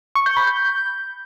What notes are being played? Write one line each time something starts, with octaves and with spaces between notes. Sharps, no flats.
C#6
G6
B5
G6